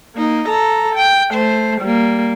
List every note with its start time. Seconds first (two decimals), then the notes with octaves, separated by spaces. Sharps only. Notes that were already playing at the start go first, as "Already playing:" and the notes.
0.15 A#3 D#4
0.48 A4 A#5
0.95 G5
1.32 A3 C5
1.81 G3 A#3